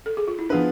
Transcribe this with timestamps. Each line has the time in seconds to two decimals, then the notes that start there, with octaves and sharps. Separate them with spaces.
0.06 A4
0.17 G#4
0.28 F4
0.39 E4
0.49 F3 B3 D4 F4 G#4 B4